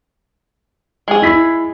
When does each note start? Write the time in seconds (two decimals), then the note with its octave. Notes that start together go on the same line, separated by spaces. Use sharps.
1.08 G#3 G#4
1.22 E4 B6 C7